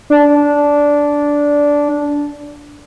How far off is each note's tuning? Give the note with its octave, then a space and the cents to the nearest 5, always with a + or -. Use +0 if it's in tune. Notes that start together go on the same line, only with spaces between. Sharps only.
D4 -10